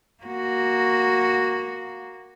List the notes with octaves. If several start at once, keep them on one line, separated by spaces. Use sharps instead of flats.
A#3 F#4